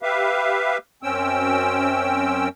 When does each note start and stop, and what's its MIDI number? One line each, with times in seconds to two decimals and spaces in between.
0.02 0.78 67
0.02 0.78 71
0.02 0.78 76
0.02 0.78 77
1.03 2.49 42
1.03 2.49 60
1.03 2.49 61
1.03 2.49 79
1.03 2.49 88